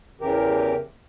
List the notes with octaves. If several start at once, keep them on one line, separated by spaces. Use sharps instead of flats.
E2 C#3 E3 G4 A#4